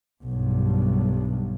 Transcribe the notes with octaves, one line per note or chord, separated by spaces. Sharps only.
B1 G2